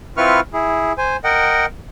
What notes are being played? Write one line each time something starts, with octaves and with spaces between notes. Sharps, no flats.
C4 E4 F4 B4 C#6 F6
E4 G#4
C5 G#5
A#4 D#5 F#5 G5